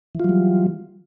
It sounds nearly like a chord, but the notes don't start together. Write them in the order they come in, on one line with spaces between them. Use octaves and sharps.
E3 F4 F#3 G3